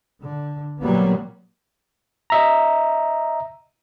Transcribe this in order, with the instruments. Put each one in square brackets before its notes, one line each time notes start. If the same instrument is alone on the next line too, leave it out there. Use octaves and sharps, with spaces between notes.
[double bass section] D3
A#2 F#3 G3 A#3 B3
[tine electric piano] D#5 E5 A#5